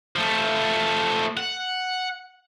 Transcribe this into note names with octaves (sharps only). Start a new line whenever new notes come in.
F3 A3
F#5